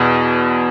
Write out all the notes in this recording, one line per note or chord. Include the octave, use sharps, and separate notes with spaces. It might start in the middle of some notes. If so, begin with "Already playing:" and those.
Already playing: E2 B2